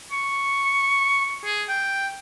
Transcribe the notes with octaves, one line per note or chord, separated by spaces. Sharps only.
C#6
G#4
G5